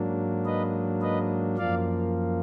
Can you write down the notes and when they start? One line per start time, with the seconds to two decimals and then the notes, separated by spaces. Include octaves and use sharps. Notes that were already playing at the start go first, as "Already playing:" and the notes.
Already playing: G#2 F#3 A#3 D4
0.46 B4 D#5
1.02 B4 D#5
1.57 F#2 F3 A#3 D5 F5